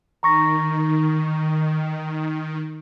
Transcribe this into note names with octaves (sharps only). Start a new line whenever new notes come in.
D#3 A#5 C#6 A#6